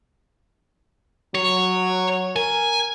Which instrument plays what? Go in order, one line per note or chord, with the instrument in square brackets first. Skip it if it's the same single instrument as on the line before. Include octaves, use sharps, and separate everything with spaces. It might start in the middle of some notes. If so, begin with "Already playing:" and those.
[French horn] F#3 [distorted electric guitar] C#5
[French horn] A#4 [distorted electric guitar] G#5